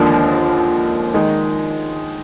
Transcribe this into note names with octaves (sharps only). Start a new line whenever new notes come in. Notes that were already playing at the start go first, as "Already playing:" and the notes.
Already playing: D#2 D3 F3 G#3 A#3 D4
D#3 G#3